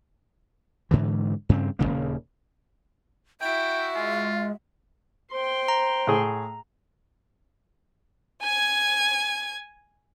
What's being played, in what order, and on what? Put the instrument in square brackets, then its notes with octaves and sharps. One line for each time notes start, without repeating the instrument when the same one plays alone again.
[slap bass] G#2 D3 E3
G2 C#3 B3 C4
D#1 E2 C#3 A#3
[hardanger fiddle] E4 F#4 [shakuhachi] E5 [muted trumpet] G5 [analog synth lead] D7
[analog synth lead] G#3 [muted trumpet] F4
[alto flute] C5 [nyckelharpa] G5 C6
[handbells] A#5
[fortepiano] A2 G#4
[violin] G#5 G#6